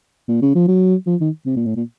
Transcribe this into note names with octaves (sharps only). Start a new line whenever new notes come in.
A#2
C#3
F3
F#3
F3
D#3
C3
A#2
A2
A#2